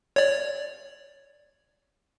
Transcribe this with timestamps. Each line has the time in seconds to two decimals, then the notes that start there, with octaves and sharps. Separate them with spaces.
0.16 C#5 D5